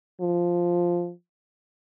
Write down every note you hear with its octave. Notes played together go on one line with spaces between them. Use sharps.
F3